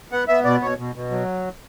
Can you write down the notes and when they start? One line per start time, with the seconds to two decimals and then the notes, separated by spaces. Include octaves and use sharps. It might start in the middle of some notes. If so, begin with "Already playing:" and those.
0.12 B3 F#5
0.28 B3 E5
0.45 B2 D5
0.61 B2 C#5
0.78 B2
0.96 B2
1.11 F#3